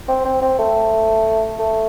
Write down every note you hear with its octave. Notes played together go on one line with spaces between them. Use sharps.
C4
C4
C4
A3
A3